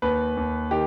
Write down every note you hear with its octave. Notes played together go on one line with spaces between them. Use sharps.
D#2 B4
D#2
D#3 G4